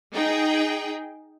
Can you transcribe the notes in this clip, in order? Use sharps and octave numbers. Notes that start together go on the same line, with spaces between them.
D#4 G#4 G5